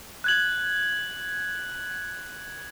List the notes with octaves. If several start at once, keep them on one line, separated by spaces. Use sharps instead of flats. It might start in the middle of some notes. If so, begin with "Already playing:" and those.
F#6 G#6 F#7